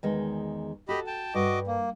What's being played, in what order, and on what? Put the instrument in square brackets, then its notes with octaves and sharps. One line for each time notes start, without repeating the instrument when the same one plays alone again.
[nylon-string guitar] E2 D#3 G#3
[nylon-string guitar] F#4 A4 [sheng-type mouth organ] G4 D#5 B5
[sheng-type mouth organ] G5 A5
[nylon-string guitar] G2 [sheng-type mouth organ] F#4 D#5 D6
[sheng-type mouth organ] A#3